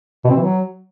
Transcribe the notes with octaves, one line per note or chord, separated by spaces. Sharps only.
B2
C4
E3
F#3